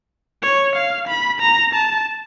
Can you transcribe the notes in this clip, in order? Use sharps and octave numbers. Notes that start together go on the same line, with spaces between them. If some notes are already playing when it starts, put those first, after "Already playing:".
C#5
F5
B5
A#5
A5